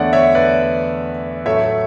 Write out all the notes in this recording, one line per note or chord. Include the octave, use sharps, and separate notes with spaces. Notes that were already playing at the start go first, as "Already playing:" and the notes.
Already playing: E2 D3 A3 C#5 D5 E5 F#5
C#5 E5
B4 D5
A2 F#3 A3 C#5 E5